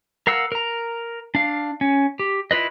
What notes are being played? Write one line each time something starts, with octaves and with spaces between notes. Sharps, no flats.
A#4 F5 F#5 E6
A#4 A#5
D4 F5
C#4
G4
E4 F4 B4 D#5